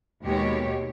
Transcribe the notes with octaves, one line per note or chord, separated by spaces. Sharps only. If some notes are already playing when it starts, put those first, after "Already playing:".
D#2 B2 G#3 G4 C#5